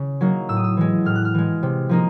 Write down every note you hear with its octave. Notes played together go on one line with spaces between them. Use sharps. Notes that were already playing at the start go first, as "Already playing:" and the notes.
Already playing: C#3
F#3 A#3 D#4
A2 E6
D#6
E6
E3 G#3
A2 F6
F#6
F6
E3 G#3
C3
F3 A#3 D#4